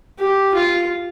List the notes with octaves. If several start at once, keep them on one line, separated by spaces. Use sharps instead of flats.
G4
F4